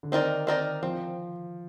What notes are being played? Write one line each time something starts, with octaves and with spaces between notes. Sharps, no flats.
D3
D#3 C4 D#4 A#4 D5
C4 D#4 A#4 D5
F3 C4